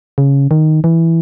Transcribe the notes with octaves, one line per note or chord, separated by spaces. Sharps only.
C#3
D#3
E3